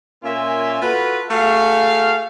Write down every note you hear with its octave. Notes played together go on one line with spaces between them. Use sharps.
A#2 A#3 C#4 F4 E5 G#5
F4 F#4 A4 B4
A3 F#4 G#4 F5